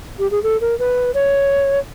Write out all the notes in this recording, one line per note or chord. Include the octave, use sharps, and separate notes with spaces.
G4
G#4
A4
A#4
B4
C#5